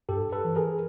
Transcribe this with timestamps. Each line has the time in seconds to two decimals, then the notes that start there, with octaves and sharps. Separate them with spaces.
0.09 G2 G4 A4
0.32 A4 B4
0.45 E3
0.56 G#4 A#4